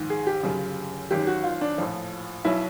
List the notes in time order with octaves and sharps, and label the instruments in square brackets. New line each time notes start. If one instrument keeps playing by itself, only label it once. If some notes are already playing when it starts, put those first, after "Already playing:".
Already playing: [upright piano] A#1 G#2 D#3
G#4
G4
G1 F#2 C#3
G#1 F#2 D#3 G4
F#4
F4
D4
A#1 A2 F3
B1 B2 F#3 E4